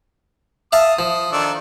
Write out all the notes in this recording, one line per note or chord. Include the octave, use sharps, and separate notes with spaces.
E5 F5 A5 D#6
F3
D#3 D4 A4